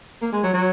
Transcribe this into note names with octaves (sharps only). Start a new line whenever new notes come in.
A#3
G#3
F#3
F#3